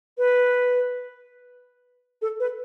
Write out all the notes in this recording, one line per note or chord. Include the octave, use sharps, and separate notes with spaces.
B4
A4
B4